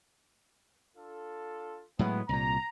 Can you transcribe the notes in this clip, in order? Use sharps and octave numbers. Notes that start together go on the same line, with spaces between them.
D4 F4 A4
A2 F#3 G#3 B3
C2 A#2 A#5